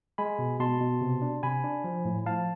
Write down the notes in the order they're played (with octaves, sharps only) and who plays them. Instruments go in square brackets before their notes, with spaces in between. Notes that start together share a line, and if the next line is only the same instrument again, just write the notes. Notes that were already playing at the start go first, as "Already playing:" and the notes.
[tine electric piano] G#3 G#5 B5
B2
B2 A5 C6
B2
C3
D4
C3 G#5 B5
D4
F3
A2
F3 F5 A5